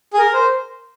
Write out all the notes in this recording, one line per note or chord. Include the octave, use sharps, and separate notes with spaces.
G#4
A#4
C5